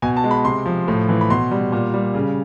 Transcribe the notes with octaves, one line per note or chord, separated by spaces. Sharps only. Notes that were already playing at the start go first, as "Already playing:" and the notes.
B2 G#5
A5
G#3
B5
C3 C6
F3
A2
E3
B5
B2 C6
G3
A#2
G3
C#3